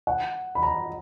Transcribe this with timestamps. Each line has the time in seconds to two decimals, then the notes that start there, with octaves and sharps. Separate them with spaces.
0.07 F#5
0.55 B5
0.63 A#5